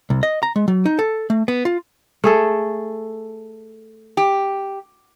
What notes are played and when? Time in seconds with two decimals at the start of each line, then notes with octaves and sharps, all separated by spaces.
0.10 C2
0.23 D#5
0.43 A#5
0.56 G#3
0.68 F#3
0.85 D#4
0.99 A4
1.30 A3
1.48 B3
1.65 F4
2.24 A3 G#4 A4
4.17 G4